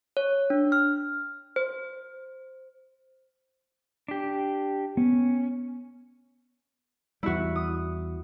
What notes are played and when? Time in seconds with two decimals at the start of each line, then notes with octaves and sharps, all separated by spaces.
0.17 C#5
0.50 D4
0.72 F6
1.56 C5
4.08 D4 G4
4.97 B3 C#4
7.23 E2 G3 E4 F#4
7.56 D#6